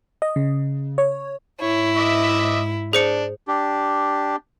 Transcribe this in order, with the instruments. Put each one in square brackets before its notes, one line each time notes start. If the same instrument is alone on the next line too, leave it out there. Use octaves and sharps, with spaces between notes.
[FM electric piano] D#5
C#3
C#5
[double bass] G#2 [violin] E4 [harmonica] C#5
[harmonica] D#5 E5 D6
[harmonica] D4 [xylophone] G#4 C5 C#7
[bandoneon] D4 G4